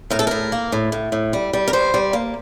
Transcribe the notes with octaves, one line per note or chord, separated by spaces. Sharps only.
A2 A#4
A4
A2 A#4
A#3
A2
A2
A2
G3
G3
A#4
G3 C5
G3
A#3